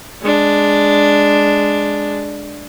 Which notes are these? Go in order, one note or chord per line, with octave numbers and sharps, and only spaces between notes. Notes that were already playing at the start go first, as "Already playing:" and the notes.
G#3 D4